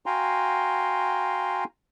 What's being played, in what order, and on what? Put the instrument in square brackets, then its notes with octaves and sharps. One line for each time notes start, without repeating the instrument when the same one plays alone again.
[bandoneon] F#4 F5 G5 G#5 A#5 C6